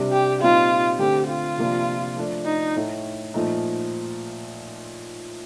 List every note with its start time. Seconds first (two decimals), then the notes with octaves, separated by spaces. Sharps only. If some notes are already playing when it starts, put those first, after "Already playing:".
Already playing: C3 G3 D4
0.12 G4
0.42 A#2 G3 C4 D#4 F4
0.99 D3 A3 C4 G4
1.29 F4
1.58 C3 F3 A#3 D4
2.16 F3 A3 D4
2.46 D#4
2.76 A2 A3 D#4
3.34 A#2 F3 A3 D#4